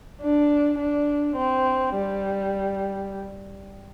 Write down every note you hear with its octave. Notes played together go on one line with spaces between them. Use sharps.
D4
D4
C4
G3